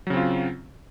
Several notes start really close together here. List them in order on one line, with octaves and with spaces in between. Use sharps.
F#3 C#3 C4 F4